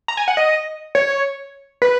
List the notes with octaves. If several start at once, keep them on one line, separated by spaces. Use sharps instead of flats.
A#5
G#5
F#5
D#5
C#5
B4